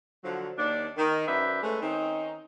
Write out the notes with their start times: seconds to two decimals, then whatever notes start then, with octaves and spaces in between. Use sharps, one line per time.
0.24 D3 F3 F#3
0.58 D#2 D4
0.98 D#3
1.27 F#2 B4 C5 D5 E5
1.63 G#3 A3 C#4 A4 B4
1.81 D#3 C4 C#4 D#4